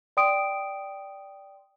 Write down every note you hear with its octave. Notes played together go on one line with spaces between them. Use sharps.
D5 G5 C6 D#6 D7